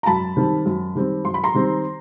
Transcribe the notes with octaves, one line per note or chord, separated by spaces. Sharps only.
A#5
F#2 A5 B5
D#3 G3 C4
F#2
D#3 G3 C4
F#2 C6
B5
A#5 C6
D#3 G3 C4